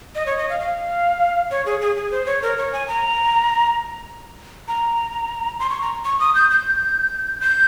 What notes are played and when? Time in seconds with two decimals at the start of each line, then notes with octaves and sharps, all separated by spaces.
0.15 D#5
0.26 C#5
0.38 D#5
0.50 F5
0.60 F5
1.51 C#5
1.66 G#4
1.81 G#4
1.96 G#4
2.11 C5
2.26 C#5
2.42 A#4
2.58 C#5
2.73 G#5
2.88 A#5
4.68 A#5
5.60 C6
5.70 C#6
5.82 A#5
6.05 C#6
6.20 D#6
6.35 G6
6.51 G6
7.41 G6